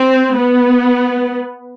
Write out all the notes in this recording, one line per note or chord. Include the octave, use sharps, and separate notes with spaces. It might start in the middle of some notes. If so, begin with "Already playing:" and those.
Already playing: C4
B3